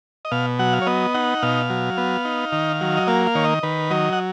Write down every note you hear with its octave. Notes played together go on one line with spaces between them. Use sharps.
D#5
B2 F5
F#3 F#5
F5
C#5
B3 D#5
D#4 F#5
B2 F5
F#3
B3
D#4
D#3
F#3
D#5
A#3 F5
F5
D#3 C#5
D#5
D#3 B4
F#3 D#5
F#5